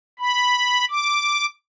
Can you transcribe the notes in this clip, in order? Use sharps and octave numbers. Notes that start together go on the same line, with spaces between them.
B5
D6